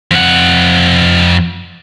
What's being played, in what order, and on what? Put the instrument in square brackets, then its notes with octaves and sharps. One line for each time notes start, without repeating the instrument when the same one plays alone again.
[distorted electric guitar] F2 F#5